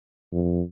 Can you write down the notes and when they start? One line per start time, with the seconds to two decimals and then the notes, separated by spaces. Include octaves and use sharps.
0.32 F2